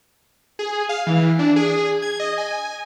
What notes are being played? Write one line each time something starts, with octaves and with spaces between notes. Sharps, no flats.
G#4
F5
E3
D4
G#4
G#6
D#5
G#5